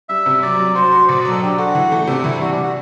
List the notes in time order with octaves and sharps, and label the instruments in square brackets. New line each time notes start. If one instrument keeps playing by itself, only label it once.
[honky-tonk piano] G3 [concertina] E5
[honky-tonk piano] C3
[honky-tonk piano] F#3 [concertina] D5
[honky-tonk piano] F#3
[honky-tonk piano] F#4 [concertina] C5
[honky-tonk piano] F#4
[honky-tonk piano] B2 [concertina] D5
[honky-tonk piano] F#3 [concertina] D5
[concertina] A4
[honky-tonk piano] D4 [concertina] G4
[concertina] F#4 [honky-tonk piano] A4
[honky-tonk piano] E3
A3
[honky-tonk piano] C3 [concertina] D4
[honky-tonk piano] E3 [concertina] E4
[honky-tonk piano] G3 [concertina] F#4
[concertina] D4
[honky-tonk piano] G3
[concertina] F#4